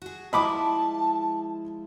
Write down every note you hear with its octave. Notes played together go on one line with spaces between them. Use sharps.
F#4 G#4
F3 G#3 E4 D#5 A5 B5 D6